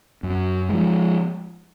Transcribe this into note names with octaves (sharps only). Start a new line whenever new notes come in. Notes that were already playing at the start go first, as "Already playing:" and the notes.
F#2
F3 G#3